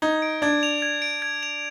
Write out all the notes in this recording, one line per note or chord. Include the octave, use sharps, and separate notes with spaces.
D#4 G#6
D7
D4 G#6
F7
G#6
D7
G#6
F7